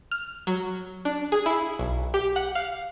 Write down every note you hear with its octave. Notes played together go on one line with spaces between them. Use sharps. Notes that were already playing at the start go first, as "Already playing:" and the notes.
F6
F#3
D4
G#4
E4
B1
G4
F#5
F5